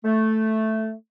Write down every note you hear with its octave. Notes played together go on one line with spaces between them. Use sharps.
A3